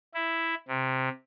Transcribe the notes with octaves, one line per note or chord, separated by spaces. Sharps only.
E4
C3